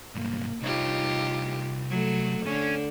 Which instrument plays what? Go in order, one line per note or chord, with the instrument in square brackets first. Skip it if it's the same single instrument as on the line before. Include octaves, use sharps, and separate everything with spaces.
[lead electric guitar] B1 G2 [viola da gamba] A#3
[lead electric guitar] C2 C#5 [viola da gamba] D#4 F4 G4
[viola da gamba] F#3 A3 A4
[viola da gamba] D3 [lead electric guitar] C#4